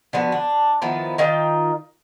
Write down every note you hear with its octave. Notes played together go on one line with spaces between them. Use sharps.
D3 F3 B3 F#4
D4
D#3 F3 B3 E4
D#3 D#4 F4 G5